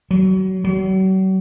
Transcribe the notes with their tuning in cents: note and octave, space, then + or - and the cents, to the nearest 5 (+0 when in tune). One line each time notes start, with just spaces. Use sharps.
F#3 +30
F#3 +40